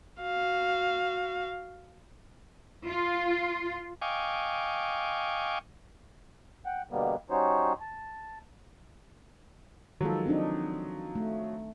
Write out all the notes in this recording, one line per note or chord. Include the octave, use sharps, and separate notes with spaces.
F#4 F5
F4
D#5 F5 G5 G#5 C#6 D6
F#5 G5
B2 D3 G3 A#3 B3
G3 C#4 D#4 F#4 C5 C#5
A5
D#3 F3 F#3 G#3 A4
C4 D4 D#4
A3